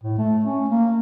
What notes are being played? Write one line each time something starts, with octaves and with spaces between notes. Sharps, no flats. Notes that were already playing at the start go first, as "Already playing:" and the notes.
A2
A3
C#4
A#3